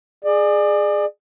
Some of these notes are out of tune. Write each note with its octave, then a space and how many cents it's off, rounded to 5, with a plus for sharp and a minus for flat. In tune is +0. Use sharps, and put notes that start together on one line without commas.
G#4 +0 D5 +30